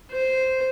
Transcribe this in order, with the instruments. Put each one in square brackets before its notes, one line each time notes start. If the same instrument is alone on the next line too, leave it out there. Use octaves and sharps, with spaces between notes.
[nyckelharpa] C5